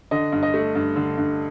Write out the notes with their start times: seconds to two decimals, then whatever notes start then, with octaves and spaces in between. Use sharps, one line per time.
0.11 D3 D#5
0.32 G2
0.43 D#5
0.54 A3
0.75 G2
0.96 D3
1.18 G2